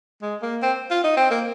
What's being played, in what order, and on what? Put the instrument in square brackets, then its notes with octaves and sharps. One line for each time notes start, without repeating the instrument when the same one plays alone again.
[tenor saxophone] G#3
A#3
C4
F4
D#4
C4
A#3